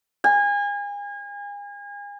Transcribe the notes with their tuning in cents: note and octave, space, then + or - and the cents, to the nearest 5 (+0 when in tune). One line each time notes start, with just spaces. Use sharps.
G#5 -35